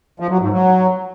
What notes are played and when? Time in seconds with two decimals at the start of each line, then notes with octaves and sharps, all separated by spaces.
0.20 F3
0.31 F#3
0.42 G#2
0.53 F#3